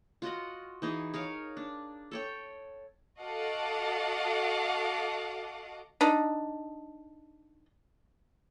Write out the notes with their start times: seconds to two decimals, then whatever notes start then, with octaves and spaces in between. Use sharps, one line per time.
0.22 F4 F#4 D#5 F#5
0.82 E3 D#4 G#4
1.13 G#4 A#4 C#5 F5
1.57 D4
2.11 A4 C#5 G5
3.20 F#4 A4 D#5 F5 F#5 D6
6.01 D4 D#4